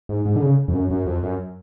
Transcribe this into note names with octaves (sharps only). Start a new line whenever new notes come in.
G#2
G#2
D3
C#3
F2
F#2
F#2
F2
F#2